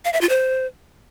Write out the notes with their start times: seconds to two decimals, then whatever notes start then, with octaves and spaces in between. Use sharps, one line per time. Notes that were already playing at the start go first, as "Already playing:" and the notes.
0.05 F5
0.13 E5
0.21 F4
0.29 C5